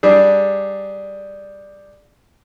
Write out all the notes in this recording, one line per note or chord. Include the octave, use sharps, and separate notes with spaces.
G3 D4 G#4